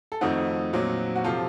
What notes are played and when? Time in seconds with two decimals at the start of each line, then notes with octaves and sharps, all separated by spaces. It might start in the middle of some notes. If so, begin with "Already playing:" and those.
0.12 A4
0.21 F2 D#3 A3 C4 D#4 F#4
0.73 A#2 F#3 C4
1.16 F#4
1.24 C3 F3 F4 A4